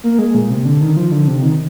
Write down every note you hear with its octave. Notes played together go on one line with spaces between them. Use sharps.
A#3
G#3
A#2
C3
D3
D#3
F3
D3
C3
D#3